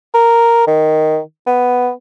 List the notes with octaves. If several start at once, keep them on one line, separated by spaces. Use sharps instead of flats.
A#4
D#3
B3